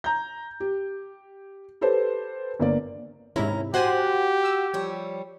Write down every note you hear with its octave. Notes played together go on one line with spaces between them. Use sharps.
A#5 G6
G4
G4 A4 B4 C5
G1 A#3 D5
D#2 G#2 C3 C#4 E4 A#5
F#4 G4 C5 F#5 G#5
E6
F3 G3 C#5